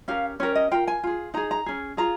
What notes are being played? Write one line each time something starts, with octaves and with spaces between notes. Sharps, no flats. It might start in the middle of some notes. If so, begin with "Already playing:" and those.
C#4 G4 A#4 F5
C#4 G4 A#4 C#5
D#5
F4 A#4 G5
G#5
F4 G#4
D#4 G#4 A#5
A#5
C#4 G#4
F4 G#4 A#5